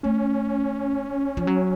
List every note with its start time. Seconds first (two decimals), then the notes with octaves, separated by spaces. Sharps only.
0.03 A3 C#4
1.37 F3
1.47 F#3